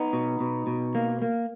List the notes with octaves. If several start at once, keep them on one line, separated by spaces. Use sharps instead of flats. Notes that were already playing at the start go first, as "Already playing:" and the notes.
Already playing: B3 D#4
B2
B2
B2
A#3
A#3